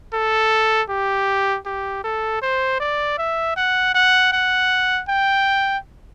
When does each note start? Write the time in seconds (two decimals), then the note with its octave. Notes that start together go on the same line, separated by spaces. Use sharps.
0.13 A4
0.90 G4
1.66 G4
2.04 A4
2.42 C5
2.80 D5
3.18 E5
3.56 F#5
3.95 F#5
4.32 F#5
5.09 G5